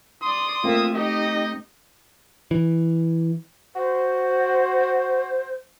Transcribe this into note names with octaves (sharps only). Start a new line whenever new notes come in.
D5 C6 D#6
A3 A#3 C4 F4 E5
D#4 G4 D#5
E3
F#4 C5